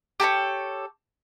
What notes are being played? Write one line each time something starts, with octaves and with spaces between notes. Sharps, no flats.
G4 A4 A#4 C#5